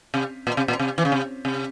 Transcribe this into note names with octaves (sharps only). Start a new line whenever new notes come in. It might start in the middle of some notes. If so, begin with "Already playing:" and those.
C3
A#2
C3
A#2
C3
E3
C#3
C3
C3